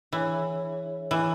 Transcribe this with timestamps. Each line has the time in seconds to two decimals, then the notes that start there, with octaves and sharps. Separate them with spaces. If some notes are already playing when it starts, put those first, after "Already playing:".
0.12 E3 D4 G#4 C#5 E5
1.11 E3